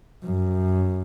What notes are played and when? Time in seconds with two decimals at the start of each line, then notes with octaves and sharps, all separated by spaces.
0.25 F#2